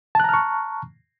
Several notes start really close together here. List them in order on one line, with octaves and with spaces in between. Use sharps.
A5 F#6 A#5 F6 C#6